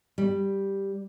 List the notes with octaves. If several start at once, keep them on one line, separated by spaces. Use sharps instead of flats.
G3